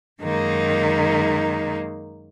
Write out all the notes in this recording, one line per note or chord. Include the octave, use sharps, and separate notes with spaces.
F#2 D#3 G#3 A#3 D#4